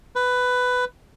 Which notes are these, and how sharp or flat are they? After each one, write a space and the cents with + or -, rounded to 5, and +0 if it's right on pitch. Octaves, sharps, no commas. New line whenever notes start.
B4 +10